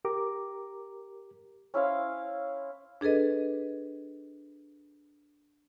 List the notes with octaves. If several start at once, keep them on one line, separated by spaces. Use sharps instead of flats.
G4 A#4 A#5 D6
C#4 E4 C5 F5
D4 G#4 A4 B4 D#5